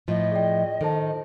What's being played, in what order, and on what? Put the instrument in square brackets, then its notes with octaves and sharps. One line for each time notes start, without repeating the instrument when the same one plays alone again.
[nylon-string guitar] A2 F3 [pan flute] D#5
[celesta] G#4 D5 G5
[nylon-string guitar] D#3 [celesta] A4 C5 A5